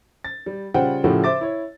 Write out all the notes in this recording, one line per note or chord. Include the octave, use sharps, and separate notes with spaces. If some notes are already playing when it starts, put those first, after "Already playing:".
A6
G3
C#3 G3 F4 C5 F#5 G5
A2 C#3 F3 F#4 G4 A4
C5 E5 D6 A6
E4 C#5